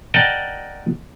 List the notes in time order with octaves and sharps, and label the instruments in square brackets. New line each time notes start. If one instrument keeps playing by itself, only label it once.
[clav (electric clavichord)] A#4 D5 D#5 F#5 G5 A5